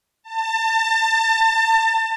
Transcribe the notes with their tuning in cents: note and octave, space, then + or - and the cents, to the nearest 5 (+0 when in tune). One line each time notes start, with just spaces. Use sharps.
A5 +30